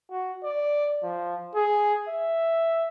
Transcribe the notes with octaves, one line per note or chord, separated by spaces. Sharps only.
F#4
D5
F3
G#4
E5